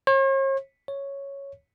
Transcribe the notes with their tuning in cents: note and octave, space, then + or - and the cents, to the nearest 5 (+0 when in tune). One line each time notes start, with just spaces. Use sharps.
C#5 -45
C#5 +0